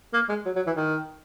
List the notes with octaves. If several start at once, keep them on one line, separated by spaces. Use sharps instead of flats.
A#3
G#3
F#3
F#3
E3
D#3